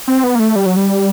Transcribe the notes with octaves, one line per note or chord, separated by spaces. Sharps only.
C4
B3
A#3
A3
G3
F#3
G3